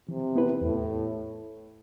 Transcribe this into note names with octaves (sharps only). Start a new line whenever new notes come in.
C3 E3
B3 E4 B4
E2 A2